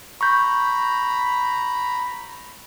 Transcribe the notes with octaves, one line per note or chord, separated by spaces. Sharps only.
A#5 B5 C#6 G6